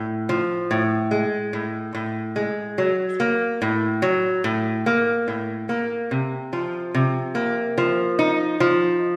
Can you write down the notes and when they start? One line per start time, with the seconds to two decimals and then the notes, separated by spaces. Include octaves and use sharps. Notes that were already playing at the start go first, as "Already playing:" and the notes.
Already playing: A2
0.29 F3
0.71 A2
1.11 G#3
1.53 A2
1.95 A2
2.36 G#3
2.78 F#3
3.20 A#3
3.62 A2
4.02 F#3
4.44 A2
4.86 A#3
5.28 A2
5.69 A#3
6.11 C3
6.53 F3
6.94 C3
7.35 A#3
7.78 F3
8.19 D#4
8.60 F3